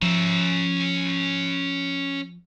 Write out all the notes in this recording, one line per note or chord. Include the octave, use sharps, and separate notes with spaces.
F3 C#4 E5